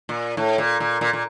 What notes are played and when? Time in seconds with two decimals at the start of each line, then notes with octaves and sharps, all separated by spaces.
0.09 A#2
0.37 A2
0.58 A#2
0.80 A#2
1.01 A#2
1.13 A#2